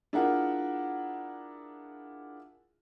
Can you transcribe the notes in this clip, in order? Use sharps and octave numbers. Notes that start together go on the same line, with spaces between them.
D4 E4 F4 G#4 A#4 F#5